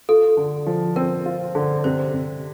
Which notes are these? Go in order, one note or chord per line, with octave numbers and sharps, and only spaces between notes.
F4 A4
D3
F3
C4 A#4
F4
D3
C3 C5
C3